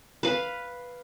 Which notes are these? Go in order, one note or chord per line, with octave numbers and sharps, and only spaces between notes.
B4 F5